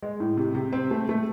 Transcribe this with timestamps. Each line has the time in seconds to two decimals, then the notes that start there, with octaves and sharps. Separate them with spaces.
0.02 G#3
0.20 A2
0.37 C3
0.55 C3
0.73 C4
0.91 A3
1.09 A3